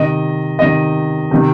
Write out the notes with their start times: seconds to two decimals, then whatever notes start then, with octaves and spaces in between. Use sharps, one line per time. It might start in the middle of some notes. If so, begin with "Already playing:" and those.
Already playing: C3 D#3 D#5
0.59 C3 D#3 D#5
1.31 C3 D#3